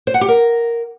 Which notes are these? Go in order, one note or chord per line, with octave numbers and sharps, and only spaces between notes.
C5
F#5
G4
A#4